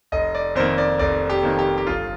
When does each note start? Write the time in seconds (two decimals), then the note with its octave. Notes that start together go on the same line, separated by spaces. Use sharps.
0.12 F1 D#5
0.35 D5
0.55 F2 D#3 A#3 C5
0.78 D5
0.99 F1 D5
1.30 G4
1.43 F2 D#3 A#3
1.59 G4
1.78 G4
1.87 G1 F4